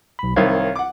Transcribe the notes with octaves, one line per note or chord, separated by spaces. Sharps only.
B1 B5
C2 D#3 C4 C#5 F5 G#6
F#5 D6